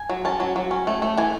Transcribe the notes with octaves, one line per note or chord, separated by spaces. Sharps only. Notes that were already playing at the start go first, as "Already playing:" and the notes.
Already playing: G#5
F#3
C#4 A5
F#3
F#3
C#4
A3
A3
E3 G#5